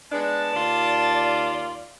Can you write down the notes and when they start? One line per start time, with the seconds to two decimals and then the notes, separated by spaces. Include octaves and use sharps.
0.12 G#3 B3 D4 A5
0.54 D#2 F4 D5